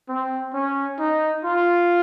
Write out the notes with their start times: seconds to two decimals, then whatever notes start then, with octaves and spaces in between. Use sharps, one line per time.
0.09 C4
0.54 C#4
0.99 D#4
1.45 F4